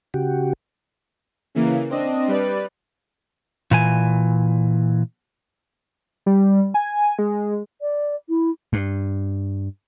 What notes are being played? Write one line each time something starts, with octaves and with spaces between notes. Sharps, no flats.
C#3 F#4 G4
C#3 E3 A#3
C4 D4 D#5
G3 B4 D5
A#2 E3 G#5
G3
G#5
G#3
D5
E4
G2